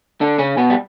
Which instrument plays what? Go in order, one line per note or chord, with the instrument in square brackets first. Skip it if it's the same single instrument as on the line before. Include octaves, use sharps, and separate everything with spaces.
[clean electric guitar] D3 D4
C#3 C#4
B2 B3
G3